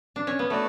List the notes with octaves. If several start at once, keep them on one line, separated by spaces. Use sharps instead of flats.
D4
C#4
B3
A3 D4 F#4 B4 D5